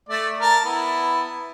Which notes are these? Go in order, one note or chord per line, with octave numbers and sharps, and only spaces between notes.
A3 D5
A#4 A5
B3 E4